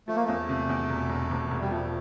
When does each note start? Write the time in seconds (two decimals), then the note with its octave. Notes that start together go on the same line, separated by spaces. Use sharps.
0.08 F3 A3
0.16 A#3
0.24 E2 A3
0.49 C3
0.69 E2
0.90 E1
1.10 E1
1.31 E1
1.51 E1
1.61 G3
1.71 F3 A3